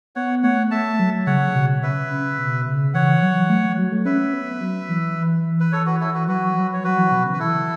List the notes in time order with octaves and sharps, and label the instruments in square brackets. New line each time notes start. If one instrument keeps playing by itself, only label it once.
[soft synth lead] B3 [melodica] C#5 F#5
[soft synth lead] A3 [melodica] C#5 F#5
[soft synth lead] A3 [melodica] E5 A5
[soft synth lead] F#3
[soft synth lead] C#3 [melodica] C#5 F#5
[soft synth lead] B2
[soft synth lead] C#3 [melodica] B4 E5
[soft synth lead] C#3
B2
C#3
[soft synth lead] E3 [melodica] C#5 F#5
[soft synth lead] F#3
A3
F#3
A3
[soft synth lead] C#4 [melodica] B4 E5
[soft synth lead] B3
F#3
E3
[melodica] B4
A4 C#5
F#4 B4
E4 A4
F#4 B4
[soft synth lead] F#3 [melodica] F#4 B4
[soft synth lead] F#3
[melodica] C#5
[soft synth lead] F#3 [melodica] F#4 B4
[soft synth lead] E3
B2
C#3
[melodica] B4
[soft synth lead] E3 [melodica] E4 A4